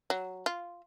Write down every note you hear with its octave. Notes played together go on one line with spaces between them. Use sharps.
F#3
F4